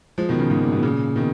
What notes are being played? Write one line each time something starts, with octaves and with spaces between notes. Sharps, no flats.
F3 G#3
B2 D#3
C#3 F3
G#2 B2
A#2
G#2 B2
A#2 C#3
B2 D#3